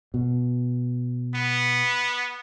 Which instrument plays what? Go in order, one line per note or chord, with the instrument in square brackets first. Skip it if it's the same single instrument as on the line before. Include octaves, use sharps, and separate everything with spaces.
[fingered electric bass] B2
[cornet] B3